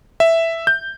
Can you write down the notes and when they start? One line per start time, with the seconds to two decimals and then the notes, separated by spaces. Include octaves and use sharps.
0.20 E5
0.67 G6